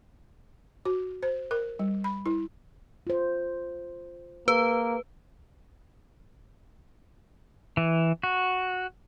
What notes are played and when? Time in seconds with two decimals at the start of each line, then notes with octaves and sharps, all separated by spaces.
0.85 F#4
1.23 C5
1.51 A#4
1.79 G3
2.04 B5
2.26 E4
3.07 F4 C5
4.48 A#3 G#4 B4
7.77 E3
8.23 F#4